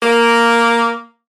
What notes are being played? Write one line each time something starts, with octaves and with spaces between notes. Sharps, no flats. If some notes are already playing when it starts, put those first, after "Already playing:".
A#3